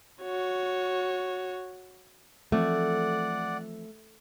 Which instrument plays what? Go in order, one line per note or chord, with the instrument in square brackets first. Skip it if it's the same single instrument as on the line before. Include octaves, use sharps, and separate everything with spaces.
[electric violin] F#4 C#5
[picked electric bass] E3 F3 C4 [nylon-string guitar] A3 [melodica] D5 F#5